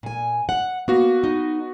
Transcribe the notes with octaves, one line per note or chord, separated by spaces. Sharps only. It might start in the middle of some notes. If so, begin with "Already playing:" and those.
A#2 G#5
F#5
A#3 B3 F#4
D#4